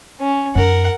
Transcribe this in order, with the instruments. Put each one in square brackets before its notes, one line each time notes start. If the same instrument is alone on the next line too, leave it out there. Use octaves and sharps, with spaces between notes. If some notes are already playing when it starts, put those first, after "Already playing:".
[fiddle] C#4
[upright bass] F#2 D#4 [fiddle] A#4 F#5